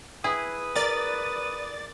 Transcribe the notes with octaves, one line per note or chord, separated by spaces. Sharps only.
E4 G#4 B4 D#6
A#4 D5 A6